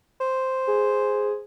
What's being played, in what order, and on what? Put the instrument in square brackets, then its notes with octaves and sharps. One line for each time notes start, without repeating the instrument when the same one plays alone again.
[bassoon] C5
[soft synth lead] G#4